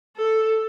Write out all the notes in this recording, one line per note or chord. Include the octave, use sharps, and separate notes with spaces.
A4